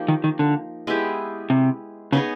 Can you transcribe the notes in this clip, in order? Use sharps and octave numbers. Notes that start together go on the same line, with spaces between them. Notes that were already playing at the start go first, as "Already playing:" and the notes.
Already playing: F3 A#3 D#4 G4
D#3
D#3
D3
G#3 B3 E4 G4
C3
C#3 B3 D#4 G#4 C#5